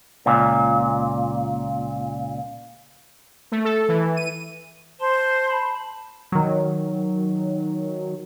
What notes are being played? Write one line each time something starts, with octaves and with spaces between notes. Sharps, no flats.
C#2 A#2
A3
A4
E3
D#7
C5 A5 C6
A5 B5
D#3 F#3